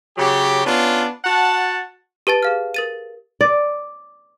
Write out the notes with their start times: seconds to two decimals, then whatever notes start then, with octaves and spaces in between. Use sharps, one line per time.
0.18 C#3 F#3 G4
0.65 B3 C#4 D4 F4
1.24 F#4 F#5 A5
2.27 G4 B4 A5 A6
2.43 G#4 F5 F6
2.74 A#4 A6 D#7
3.41 D5